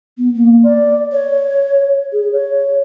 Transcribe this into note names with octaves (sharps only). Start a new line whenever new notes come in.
B3
A#3
D5
C#5
G#4
C#5